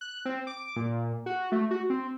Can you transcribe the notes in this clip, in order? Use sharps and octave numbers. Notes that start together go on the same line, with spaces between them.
F#6
C4
D6
A#2
F#4
A3
F#4
C4